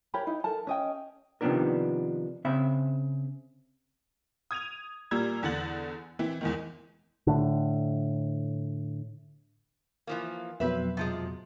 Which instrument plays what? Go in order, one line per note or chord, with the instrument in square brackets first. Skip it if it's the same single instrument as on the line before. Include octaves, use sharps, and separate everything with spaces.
[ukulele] G4 A#4 C#5 B5
D#4 E4
A4 A#4 A5
C#4 D#5 G5
[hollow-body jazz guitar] C3 D#3 F3 B3 D4 A#4
C#3 C4 E5 B5
[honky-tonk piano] D#6 G#6 D#7 F7
A#2 G3 A#5 E6 G#6
E2 D3 F#5 A6 F#7
E3 C4 E4
E2 G#2 D#3
[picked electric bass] A2 D3
[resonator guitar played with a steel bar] E3 F3 A#3
[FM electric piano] F2 B2 F#3 [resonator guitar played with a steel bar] C4 B4 E5
[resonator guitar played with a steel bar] C3 F3 G#3